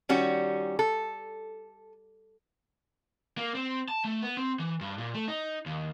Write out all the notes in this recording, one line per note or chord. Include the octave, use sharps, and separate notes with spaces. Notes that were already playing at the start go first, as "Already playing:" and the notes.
D#3 G3 C#4 F#4
A4
A#3
C4
A5
A3
B3
C4
E3
G2
A#2
A3
D#4
D#2